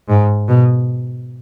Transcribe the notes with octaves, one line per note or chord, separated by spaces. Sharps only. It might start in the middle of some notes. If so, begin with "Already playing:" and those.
G#2
B2